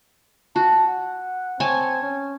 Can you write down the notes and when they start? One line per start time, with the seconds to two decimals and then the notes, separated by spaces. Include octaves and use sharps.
0.56 F#4 A5
0.87 F#5
1.60 C4 C#5 G#5 A5
2.02 C#4